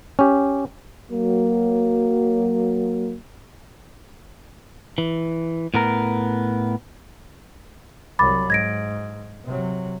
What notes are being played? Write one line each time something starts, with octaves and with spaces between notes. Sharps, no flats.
C#4 G4
F#3 A#3
E3
A2 B3 A#4
C2 F#3 B5 D6 A6
G#2 G#6 A#6 D7
C3 F#3